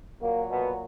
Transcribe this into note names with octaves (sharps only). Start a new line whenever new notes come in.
A#2 F#3 A#3
B2 B3